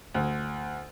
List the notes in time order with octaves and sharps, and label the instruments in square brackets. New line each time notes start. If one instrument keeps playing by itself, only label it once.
[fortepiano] D2